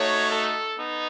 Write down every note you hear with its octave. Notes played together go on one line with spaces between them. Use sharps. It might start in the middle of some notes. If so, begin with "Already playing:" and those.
Already playing: A3 D#4 F#4 C#5
A4
B3 D#4